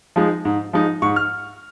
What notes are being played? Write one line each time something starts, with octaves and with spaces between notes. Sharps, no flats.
F3 G#3 D#4
G#2
F3 G#3 D#4
G#2 C#6
F6